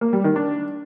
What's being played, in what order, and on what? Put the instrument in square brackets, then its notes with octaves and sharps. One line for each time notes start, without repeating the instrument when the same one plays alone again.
[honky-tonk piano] A#3
G3
D#3
D4